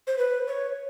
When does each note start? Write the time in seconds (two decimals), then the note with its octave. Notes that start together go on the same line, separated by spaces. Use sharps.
0.07 C5
0.18 B4
0.47 C#5